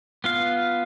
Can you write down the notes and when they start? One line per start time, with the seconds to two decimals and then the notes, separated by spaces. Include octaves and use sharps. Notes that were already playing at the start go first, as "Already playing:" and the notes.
0.24 B3 F4 F5